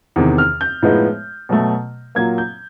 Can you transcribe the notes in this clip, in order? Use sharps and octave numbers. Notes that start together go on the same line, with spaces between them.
E2 C3 D#3
F6
G6
A2 F3 G#3 B3 D#4
B2 F#3 A3
A#2 F#3 A#3 G#6
G6